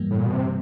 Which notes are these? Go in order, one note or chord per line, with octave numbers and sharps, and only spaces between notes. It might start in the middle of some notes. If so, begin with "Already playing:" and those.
Already playing: G2 E3 G3 A#3
A2
A#2
B2
C3